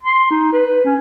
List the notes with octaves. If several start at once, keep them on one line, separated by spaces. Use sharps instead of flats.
C6
D#4
B4
C#4